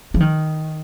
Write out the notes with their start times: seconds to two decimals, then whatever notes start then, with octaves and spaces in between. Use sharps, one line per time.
0.14 F3
0.20 D#3